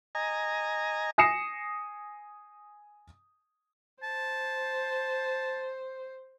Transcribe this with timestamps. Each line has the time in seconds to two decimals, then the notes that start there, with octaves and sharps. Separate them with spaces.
0.15 D#5 G#5 A#5
1.18 G#5 D#6 A#6 C7 C#7 E7
4.03 C5 A5